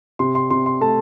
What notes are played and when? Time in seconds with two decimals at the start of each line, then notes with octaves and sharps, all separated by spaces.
0.19 C3 C6
0.35 C6
0.50 C3 C6
0.66 C6
0.81 A3 A5